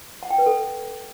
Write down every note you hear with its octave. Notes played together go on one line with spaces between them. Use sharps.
F#5
G5
B4
A4